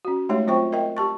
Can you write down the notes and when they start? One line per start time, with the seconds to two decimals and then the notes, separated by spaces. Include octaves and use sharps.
0.05 C#4 F#4
0.29 G#3 A3 D#4 G4 C#5 E5
0.47 F#3 C4 F4 C5 G5 C#6
0.72 A#4 D#5 E5 G5
0.97 G4 A5 C#6